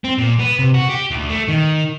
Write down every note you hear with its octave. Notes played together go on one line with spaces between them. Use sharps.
C4
A#2
B3
C3
F#4
G4
D2
A3
D#3